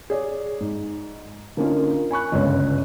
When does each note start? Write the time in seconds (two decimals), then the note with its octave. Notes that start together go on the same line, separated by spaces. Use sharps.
0.10 G#4 C#5 D5
0.60 G#2
1.57 D3 A#3 C#4 D#4 F4 A#4
2.11 G#5 B5 C#6 F#6
2.32 G1 C#2 C#3 G#3 C#5